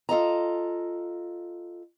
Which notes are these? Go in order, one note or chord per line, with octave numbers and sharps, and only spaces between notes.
F4 A4 D#5 A#5